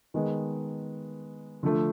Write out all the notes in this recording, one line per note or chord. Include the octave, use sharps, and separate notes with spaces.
D#3 G#3 B3
D3 F3 A3